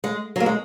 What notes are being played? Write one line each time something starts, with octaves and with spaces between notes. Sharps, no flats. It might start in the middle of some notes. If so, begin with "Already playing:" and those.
G#3
F#3
A#3
G#3